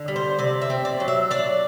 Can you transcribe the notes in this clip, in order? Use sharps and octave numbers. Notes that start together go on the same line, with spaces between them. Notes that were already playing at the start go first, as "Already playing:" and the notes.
Already playing: D3
G3
C5
C3 D5
E5
C4
D5
F#3
E5
D4 D5